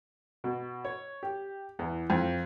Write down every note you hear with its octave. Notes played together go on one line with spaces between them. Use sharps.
B2
C#5
G4
E2
F2